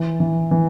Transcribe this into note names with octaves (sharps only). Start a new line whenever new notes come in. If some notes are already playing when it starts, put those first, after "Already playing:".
Already playing: E3
E3
E3